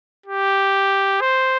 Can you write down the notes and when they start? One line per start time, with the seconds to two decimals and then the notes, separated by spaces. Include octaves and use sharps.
0.26 G4
1.21 C5